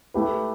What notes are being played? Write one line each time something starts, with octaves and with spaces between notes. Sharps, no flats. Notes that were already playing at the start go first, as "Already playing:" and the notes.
A3 E4 G4 B4